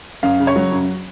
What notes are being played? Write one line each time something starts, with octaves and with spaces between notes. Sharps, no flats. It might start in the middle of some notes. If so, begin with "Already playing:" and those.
F#2 F5
C#3
C#5
F#3
F#2